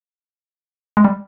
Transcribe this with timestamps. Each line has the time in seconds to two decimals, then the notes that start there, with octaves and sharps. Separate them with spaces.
0.97 G#3
1.05 G3